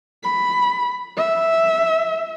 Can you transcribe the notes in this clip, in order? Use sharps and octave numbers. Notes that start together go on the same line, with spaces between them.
B5
E5